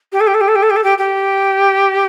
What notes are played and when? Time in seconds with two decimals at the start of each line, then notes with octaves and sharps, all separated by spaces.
0.12 G4
0.20 A4
0.27 G4
0.34 A4
0.41 G4
0.48 A4
0.55 G4
0.63 A4
0.70 G4
0.76 A4
0.84 G4
0.98 G4